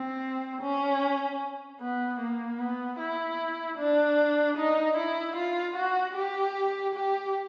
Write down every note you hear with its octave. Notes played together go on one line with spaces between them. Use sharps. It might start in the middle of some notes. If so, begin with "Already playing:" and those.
Already playing: C4
C#4
B3
A#3
B3
E4
D4
D#4
E4
F4
F#4
G4
G4